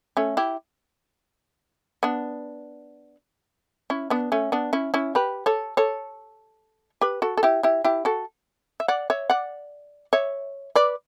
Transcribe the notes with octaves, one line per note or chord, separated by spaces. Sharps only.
A3 C#4
E4 G4
B3 D4
C#4 E4
B3 D4
A3 C#4
B3 D4
C#4 E4
C#4 E4
G4 B4
A4 C#5
A4 C#5
G4 B4
F#4 A4
A4
E4 G4
E4 G4
E4 G4
F#4 A4
E5
D5 F#5
C#5 E5
D5 F#5
C#5 E5
B4 D5